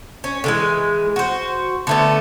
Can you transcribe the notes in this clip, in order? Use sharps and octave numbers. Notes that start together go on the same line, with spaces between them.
C#4
D3 E3 G#3
F#4 C5
D3 A3 B3